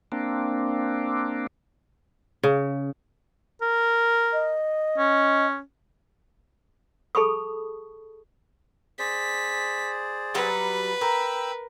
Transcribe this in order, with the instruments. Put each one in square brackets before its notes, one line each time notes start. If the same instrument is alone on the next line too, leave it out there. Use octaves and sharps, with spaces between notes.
[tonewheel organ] A#3 C4 D4
[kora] C#3
[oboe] A#4
[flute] D#5
[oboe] C#4
[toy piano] G#4 A4 A5 B5 C#6 D#6
[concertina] G#4 C5 D5 [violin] B6
[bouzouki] F#3 G3 F#5 [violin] B4
[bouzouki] A#4 [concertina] G5 B5 E6